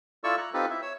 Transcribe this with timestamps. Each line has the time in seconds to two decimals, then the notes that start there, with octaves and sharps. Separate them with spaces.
0.24 E4 F4 A4 D5 C#6 E6
0.38 A#5 F#6
0.54 C4 D#4 F4 G4 A4 B4
0.70 E4 E5
0.82 C#5 E6